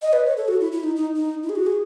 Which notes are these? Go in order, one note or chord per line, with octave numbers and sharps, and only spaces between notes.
D#5
B4
C#5
A4
F#4
E4
E4
D#4
D#4
D#4
E4
G#4
F#4
G#4